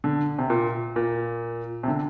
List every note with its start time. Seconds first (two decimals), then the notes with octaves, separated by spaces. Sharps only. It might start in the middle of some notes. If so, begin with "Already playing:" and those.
0.04 D3
0.39 C3
0.50 A#2
0.96 A#2
1.83 C3
1.88 D3